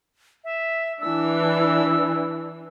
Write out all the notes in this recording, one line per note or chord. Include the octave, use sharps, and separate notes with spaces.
E5
E3 D4 E6